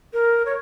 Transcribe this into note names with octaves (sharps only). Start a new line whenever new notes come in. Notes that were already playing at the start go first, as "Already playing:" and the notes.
A#4
C#5